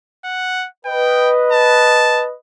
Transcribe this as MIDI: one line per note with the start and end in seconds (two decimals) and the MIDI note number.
0.24 0.67 78
0.86 2.34 71
0.86 2.34 75
0.86 1.32 79
1.52 2.25 81